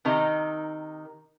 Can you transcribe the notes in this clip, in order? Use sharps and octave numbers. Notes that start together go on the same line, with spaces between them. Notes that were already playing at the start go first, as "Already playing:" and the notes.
C3 D#3 D#4 A#5